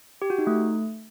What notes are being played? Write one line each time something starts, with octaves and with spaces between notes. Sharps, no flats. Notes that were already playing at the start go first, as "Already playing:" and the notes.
G4
F#4
D#4
A3